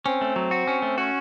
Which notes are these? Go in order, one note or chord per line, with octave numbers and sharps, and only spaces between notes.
C4 C#4
A3
F#3
F#4
C#4
A3
C#4 F#4